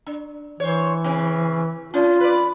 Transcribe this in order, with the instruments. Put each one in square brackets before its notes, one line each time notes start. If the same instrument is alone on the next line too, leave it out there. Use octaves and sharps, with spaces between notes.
[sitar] D4
[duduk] E3 [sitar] C5 C#5
[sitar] C#3 C4
[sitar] C#4 [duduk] F4
[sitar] B4 D5